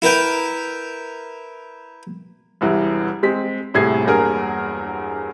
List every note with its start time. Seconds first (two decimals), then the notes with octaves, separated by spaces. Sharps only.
0.02 E4 A#4 B4 G5
2.61 E1 C2 E3
3.23 G#3 C4 B6
3.74 D#1 A2 C3 G#4 G#6 C7
4.04 E1 E2 G2 A#3 G#4 A#4